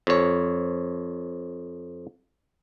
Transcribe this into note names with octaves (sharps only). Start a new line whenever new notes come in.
F2 C#5